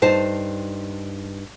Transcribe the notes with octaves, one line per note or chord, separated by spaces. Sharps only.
G2 D#4 C5 A5